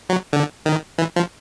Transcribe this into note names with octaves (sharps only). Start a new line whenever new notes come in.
F#3
D3
D#3
E3
F3